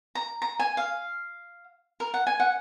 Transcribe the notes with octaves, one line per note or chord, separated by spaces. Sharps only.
A#5
A#5
G#5
F5
A#4
F#5
G#5
F#5